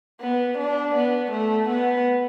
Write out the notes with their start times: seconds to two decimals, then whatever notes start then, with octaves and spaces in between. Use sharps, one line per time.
0.20 B3
0.58 D4
0.95 B3
1.31 A3
1.69 B3